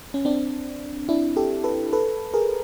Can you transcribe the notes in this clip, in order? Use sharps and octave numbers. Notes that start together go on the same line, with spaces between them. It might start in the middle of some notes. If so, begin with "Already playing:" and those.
C#4
C4 D4
D4 E4
G4 A4
A4 B4
A4 B4
G#4 A#4